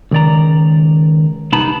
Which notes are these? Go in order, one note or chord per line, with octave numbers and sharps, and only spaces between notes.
C#2 D#3 D5 A#5
C2 B3 D#4 A5 B5